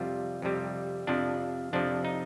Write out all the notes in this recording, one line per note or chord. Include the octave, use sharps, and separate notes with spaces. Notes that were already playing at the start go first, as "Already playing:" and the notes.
Already playing: F2 C3 G3 F4
F2 C3 G3
F2 C3 F3 D4
F2 C3 F3 D4
D#4